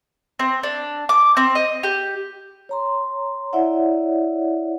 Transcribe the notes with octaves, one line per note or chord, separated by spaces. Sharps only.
C4
D4
D6
C4
D#5
G4
C#5 A#5 C6
E4 C#5 D5 E5 F#5